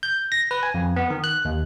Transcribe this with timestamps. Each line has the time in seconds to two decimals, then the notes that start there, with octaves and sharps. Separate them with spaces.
0.03 G6
0.32 A#6
0.51 B4
0.63 G#5
0.74 F2
0.96 B3
1.10 D#3
1.24 F#6
1.45 D#2